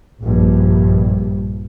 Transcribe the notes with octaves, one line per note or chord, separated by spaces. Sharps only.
A#1 G2